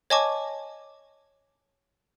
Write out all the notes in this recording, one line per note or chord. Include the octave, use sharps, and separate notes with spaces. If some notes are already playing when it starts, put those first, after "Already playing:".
C#5 D#5 G#5 A5 C#6 D6